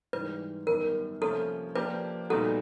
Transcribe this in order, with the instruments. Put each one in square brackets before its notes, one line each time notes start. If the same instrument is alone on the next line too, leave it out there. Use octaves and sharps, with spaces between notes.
[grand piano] G#2 E3 G3 [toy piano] B4
[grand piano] F#2 D#3 G3 B3 [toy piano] A#4
[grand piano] C3 F3 A#3 C#4 [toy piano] A4
[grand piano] F3 A#3 D4 G4 [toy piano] B4
[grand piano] A#2 G3 B3 D#4 F#4 [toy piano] A4